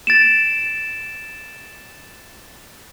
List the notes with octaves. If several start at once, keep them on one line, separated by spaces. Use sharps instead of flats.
A6 D7 E7